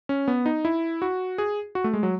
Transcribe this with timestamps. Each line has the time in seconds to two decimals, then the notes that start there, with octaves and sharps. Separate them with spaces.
0.09 C#4
0.28 B3
0.46 D#4
0.65 E4
1.02 F#4
1.38 G#4
1.75 F#4
1.84 A3
1.93 G#3
2.03 F#3